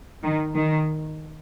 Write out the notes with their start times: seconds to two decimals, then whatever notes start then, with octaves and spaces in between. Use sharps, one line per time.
0.23 D#3
0.56 D#3